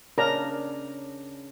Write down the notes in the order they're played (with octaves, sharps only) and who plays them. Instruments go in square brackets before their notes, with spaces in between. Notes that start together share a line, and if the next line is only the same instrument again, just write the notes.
[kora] C#3 D4 [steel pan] A#4 A#5